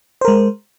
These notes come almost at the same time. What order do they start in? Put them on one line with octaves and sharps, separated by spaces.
C5 A#4 G#3